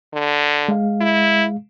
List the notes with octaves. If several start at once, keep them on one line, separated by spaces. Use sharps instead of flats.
D3
G#3 F5
E4